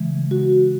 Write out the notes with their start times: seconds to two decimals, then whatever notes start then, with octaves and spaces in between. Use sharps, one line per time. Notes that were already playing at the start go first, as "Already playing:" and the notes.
Already playing: C#3 E3 G#3
0.31 F#4